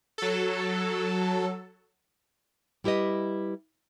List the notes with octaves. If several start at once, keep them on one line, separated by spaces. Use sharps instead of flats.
F#3 A4
G3 E4 G4 B4 D#5